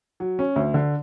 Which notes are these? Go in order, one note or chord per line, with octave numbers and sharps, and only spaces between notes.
F#3
C#4
D2
D3